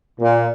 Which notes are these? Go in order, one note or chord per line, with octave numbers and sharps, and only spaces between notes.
A#2